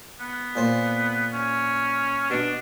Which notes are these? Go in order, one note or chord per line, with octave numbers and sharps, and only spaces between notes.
B3
A#2 C5
C#4
B2 D4